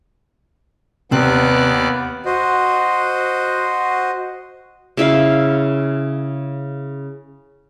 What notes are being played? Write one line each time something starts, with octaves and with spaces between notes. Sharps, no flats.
D#2 C3 B3 D5 F#6
F#4 C5 D#5
C#3 E4 E5 F5